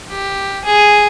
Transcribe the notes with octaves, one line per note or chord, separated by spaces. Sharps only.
G4
G#4